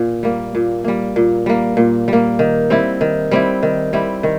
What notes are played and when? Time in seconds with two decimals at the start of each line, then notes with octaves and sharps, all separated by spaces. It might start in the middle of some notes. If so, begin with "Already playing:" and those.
Already playing: A#2
0.23 G3 A#3
0.55 A#2
0.84 G3 A#3
1.16 A#2
1.46 G3 A#3
1.77 A#2
2.08 G3 A#3
2.39 D#3
2.70 G3 C4 E4
3.01 D#3
3.31 G3 C4 E4
3.63 D#3
3.93 G3 C4 E4
4.23 D#3